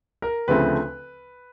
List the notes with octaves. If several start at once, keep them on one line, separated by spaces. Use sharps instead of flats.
A#4
D2 C#3 F3 A3 C4 B4